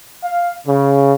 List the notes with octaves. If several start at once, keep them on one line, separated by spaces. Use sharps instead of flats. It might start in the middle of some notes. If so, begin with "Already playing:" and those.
F5
C#3